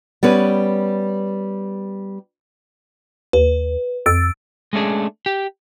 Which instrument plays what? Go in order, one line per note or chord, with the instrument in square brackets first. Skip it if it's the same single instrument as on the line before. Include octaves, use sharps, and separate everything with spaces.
[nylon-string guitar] G3 B3 C#4 B4
[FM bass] D#2 [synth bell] B4
[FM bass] F2 [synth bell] E6 A6 D7
[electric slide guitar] G#3 A3 C#4 D4 G#4
G4